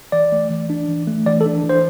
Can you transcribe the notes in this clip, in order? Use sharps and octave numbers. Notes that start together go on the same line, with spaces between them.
E3 D5
A3
E3
D4
E3
A3
E3 D5
A4
D4
E3
C5